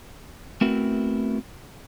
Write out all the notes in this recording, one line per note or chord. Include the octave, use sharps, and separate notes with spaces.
A3 B3 C4 E4 F#4 A#4